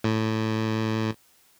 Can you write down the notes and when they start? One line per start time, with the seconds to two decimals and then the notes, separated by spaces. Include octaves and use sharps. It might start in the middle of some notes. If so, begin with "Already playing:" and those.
0.04 A2